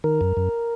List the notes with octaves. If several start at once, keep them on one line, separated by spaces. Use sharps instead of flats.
D#3 A#4
F#2
F#2